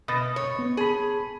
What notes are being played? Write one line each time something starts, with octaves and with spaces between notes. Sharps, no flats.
B2 D#6 A6 A#6
C#5
B3
G#4 A5 B5